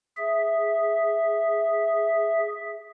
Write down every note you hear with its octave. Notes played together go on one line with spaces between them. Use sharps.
G#4 E5